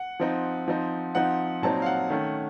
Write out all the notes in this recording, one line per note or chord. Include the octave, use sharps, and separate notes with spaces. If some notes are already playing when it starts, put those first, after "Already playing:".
Already playing: F#5
F3 C4 D#4
F3 C4 D#4
F3 C4 D#4 F#5
A#2 F#3 C4 D#4 A5
F5
F#5
D#3 A3 C#4